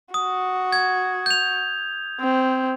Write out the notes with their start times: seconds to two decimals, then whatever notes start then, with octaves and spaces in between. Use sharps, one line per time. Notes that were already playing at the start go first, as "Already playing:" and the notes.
0.14 F#4 D#6
0.72 G#6
1.26 G6 F7
2.20 C4